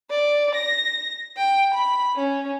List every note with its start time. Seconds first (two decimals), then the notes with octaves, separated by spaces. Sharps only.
0.10 D5
0.55 A#6
1.37 G5
1.74 B5
2.16 C#4